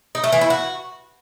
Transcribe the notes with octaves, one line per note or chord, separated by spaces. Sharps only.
D#4
A3
E3
E4
F#4